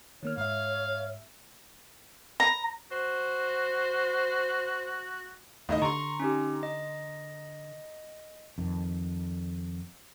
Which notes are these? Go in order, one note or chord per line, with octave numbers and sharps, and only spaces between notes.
D#3 A#3 C#5 F6
G#2 E5 F5
A#5
F#4 C5
D#2 A2 D#4 D#5
D3 A#5 C6 C#6
C#4 D#4 G4
D#5
F2 D#3